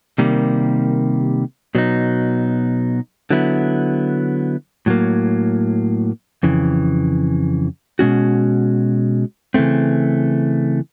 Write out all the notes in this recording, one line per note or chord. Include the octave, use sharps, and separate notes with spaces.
C3 D#3 G3 A#3
B2 F#3 B3 D#4
D3 F#3 B3 E4
A2 F#3 A#3
F2 C#3 E3
B2 G#3 C#4 F#4
C#3 E3 A3 C4